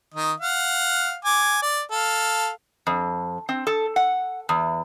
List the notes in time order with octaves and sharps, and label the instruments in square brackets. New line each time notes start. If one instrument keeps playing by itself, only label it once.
[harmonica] D#3 D#5
F5 F#5
G#5 D6
D5
A4 F5
[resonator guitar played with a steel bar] F2
C4
A4
F#5
E2